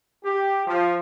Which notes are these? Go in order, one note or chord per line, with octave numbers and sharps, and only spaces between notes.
G4
F3